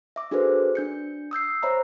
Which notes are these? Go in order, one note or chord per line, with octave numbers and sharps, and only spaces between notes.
E5 D6
D4 F#4 G#4 A4 B4 C5
D4 G6 C#7
D#6 E6 G6 C7
C5 C#5 E5 A#5 B5